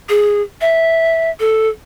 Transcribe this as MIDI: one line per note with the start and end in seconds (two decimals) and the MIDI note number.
0.09 0.41 68
0.61 1.30 76
1.40 1.67 69